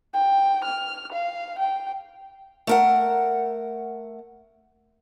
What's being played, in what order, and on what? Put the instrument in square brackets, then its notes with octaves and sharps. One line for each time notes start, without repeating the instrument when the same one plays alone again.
[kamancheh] G5
F6
F5
G5
[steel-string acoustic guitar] A3 A#4 F#5